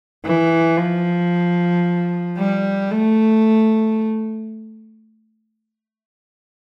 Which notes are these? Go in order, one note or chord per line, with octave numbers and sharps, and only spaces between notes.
E3
F3
G3
A3